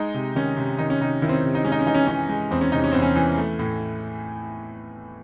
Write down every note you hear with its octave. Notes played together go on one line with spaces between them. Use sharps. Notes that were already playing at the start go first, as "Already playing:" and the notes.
Already playing: G#3 D#4
C3
D#3 C#4
C3
D#3 D#4
C#4
C3 D#4
D#3 E4
C4
C#4
C3
D#4
G#3 C#4
D#4
C#4
E3 D#4
C#4
E3 C#4
G#3
E2 C4
C#4
C3 D#4
C#4
E2 C4
C#4
E3
A3
A2